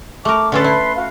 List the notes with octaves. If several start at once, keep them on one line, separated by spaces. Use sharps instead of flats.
A3 A#4 D6
D3 C#4 A4 B4 C6
E4
F#4 F5